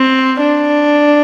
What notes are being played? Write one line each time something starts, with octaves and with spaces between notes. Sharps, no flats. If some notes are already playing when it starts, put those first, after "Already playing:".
Already playing: C4
D4